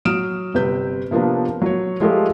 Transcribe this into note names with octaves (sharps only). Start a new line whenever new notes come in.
F#3 D#6 F6 D7 E7
G1 C3 B4 G6
C3 F3 A#3 B3 D4
F#3 C#5
F3 G#3 A3 F4 G4 A#4